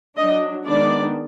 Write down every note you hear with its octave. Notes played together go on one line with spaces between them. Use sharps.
F#3 D4 D#5
D#3 G#3 B3 D4 D5